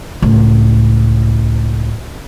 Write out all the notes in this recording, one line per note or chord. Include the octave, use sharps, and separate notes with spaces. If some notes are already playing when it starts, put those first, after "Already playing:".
C#2 A2